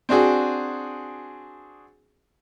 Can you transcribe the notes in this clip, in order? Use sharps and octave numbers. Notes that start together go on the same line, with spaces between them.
C4 D4 F#4 G#4